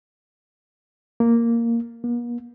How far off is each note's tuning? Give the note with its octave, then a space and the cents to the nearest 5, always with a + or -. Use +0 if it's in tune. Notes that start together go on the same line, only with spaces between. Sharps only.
A#3 -5
A#3 +45